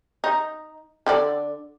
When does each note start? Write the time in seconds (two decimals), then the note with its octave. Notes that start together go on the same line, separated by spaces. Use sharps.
0.24 D#4
1.06 D3 A4 D5